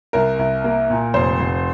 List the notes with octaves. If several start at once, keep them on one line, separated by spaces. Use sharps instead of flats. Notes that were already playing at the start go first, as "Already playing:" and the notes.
C2 A#4
C2
A#3
A#2
F1 C5
F1